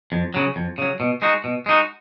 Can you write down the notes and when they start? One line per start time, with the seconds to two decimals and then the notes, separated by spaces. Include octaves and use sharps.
0.12 F2
0.34 C#3 F#3
0.56 F2
0.78 C#3 F#3
1.00 B2
1.22 G#3 D#4 F#4
1.44 B2
1.66 G#3 D#4 F#4